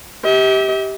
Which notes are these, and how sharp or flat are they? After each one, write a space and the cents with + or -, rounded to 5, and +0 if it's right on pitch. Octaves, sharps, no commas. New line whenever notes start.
G4 -5 E5 -45